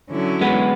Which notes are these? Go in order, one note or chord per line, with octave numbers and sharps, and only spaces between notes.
D3 F#3 C#4 E4
G#3 B3